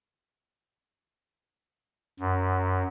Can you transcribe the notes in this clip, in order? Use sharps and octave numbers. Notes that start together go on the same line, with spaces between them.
F#2